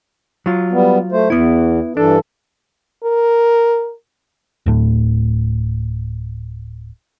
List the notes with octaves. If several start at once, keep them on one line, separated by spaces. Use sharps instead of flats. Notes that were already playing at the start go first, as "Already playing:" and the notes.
F#3 F4
G3 B3
A3 C5
E2 B3 E4
G2 E3 D4 A4
A#4
D1 A2